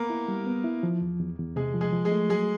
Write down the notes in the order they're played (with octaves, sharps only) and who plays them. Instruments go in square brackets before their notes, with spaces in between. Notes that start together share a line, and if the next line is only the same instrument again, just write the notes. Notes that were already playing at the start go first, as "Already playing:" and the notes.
Already playing: [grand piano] A#3 B3 A#4
[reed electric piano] E4
G3
B3
E4
F3
E2
E2
E2
[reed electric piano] C3 [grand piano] G#3 G#4
[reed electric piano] F3
[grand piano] G#3 G#4
[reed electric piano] F3
[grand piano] G#3 G#4
[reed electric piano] A3
[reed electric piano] F#3 [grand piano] G#3 G#4